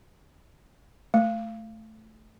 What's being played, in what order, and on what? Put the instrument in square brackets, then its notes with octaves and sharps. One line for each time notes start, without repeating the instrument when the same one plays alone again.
[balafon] A3